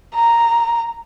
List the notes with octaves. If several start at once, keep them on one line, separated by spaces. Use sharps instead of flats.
A#5